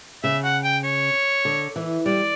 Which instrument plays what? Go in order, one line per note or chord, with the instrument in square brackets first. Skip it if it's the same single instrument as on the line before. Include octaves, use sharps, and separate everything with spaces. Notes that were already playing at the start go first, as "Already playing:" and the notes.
[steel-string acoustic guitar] C#3 [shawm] E5
[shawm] F#5
G5
C#5
[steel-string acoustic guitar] D3
E3
[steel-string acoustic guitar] G3 [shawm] D5